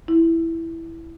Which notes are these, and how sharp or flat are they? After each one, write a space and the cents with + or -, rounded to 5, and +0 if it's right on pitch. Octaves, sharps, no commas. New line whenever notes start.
E4 +0